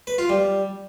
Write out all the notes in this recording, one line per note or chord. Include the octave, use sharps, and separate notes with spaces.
B4
F4
G3